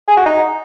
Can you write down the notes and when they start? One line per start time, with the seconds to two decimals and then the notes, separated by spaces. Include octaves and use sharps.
0.08 G#4
0.17 F#4
0.26 D#4